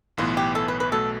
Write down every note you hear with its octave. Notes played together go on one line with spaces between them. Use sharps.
B1 A2 E3 B3 F4
G4
A4
B4
B4
B1 B2 A3 A4